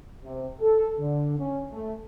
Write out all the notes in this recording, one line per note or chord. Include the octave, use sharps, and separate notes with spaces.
C3
A4
D3
C#4
A3